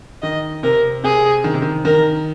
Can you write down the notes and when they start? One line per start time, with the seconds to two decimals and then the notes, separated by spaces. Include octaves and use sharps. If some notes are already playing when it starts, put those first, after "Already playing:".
0.22 D#3 D#5
0.63 C3 A#4
1.04 C3 G#4
1.44 D#3
1.54 C3
1.62 D#3
1.85 D#3 A#4